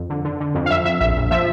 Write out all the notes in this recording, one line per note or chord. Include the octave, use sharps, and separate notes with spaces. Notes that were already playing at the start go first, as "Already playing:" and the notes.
Already playing: F2
D3
D3
D3
F2
F5
F2 E5
F2 E5
A#1 E5
A#1
F3 E5